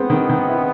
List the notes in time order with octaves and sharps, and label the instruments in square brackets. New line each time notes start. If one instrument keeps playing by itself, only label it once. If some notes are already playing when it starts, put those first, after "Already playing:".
Already playing: [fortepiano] G#3 C4 [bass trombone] B3
[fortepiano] D#3
D#3
E4